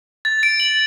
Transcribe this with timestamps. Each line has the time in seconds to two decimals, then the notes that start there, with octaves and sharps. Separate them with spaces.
0.25 A6
0.43 D7
0.60 F#7